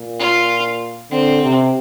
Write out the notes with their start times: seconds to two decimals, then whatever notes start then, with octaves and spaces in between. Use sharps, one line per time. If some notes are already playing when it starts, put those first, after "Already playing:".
Already playing: A#2
0.19 F4
1.11 D3 C4
1.43 C3